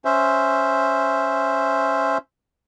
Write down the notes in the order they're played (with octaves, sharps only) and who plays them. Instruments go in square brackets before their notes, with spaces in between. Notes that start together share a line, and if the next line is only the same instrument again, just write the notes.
[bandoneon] C#4 C5 E5